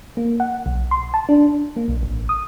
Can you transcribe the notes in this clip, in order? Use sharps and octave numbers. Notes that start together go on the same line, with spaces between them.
A#3
F#5
B1
C6
A5
D4
A#3
B1
A1
D#6